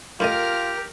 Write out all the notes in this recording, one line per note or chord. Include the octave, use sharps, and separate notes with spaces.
F#2 A2 F4 G4 A#4 D#5 F6